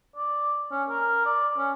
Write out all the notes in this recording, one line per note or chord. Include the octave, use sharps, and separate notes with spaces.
D5
C#4
A#4
D5
C#4